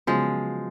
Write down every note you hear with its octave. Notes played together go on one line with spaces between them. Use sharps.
C#3 F3 F#3 G#3 B3